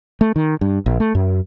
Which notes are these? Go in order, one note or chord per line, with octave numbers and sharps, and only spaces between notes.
A3
D#3
G2
A#1
A3
F#2